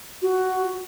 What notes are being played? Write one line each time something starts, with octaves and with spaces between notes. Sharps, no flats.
F#4